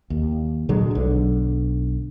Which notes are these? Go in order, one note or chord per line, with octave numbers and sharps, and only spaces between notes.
D#2
A#2 D3 F#3 G#3
B1 D3